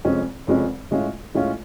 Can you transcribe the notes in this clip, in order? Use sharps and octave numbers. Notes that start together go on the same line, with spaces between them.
F1 F2 F3 G#3 C#4
F1 F2 F3 G#3 C#4
A2 G#3 C#4 F4
A2 G#3 C#4 F4